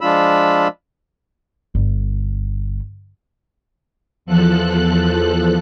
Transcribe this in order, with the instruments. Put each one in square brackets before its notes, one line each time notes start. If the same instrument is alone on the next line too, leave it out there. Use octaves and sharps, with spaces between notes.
[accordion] F3 G#3 D4 F4 B5 E6
[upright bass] G1
[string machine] E2 F3 A4 F#6